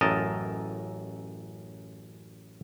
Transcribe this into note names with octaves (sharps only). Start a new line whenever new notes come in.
A1 F#2 A#4 D#5 A5